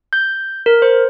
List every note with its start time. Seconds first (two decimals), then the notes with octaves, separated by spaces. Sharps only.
0.13 G6
0.66 A#4
0.82 C5